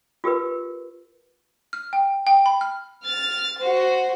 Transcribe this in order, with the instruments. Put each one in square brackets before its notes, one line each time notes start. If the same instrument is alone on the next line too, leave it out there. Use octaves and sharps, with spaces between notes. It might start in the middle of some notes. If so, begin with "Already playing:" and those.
[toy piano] F4 G4 A#4 B4
[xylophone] F6
G5
G5
B5
F6
[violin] F6 A6
F#4 C5